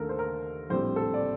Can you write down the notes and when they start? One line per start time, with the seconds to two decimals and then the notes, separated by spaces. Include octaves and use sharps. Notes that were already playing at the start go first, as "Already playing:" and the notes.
Already playing: D#2 D3 A3 A4 A#4
0.09 C5
0.19 A#4
0.70 A#1 A2 G3 C4 C5
0.96 A4
1.14 D5